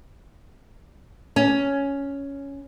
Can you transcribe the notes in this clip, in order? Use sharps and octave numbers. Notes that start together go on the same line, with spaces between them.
C#4